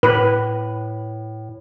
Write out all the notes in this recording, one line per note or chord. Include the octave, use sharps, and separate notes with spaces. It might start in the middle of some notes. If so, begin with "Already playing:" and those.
A2 B4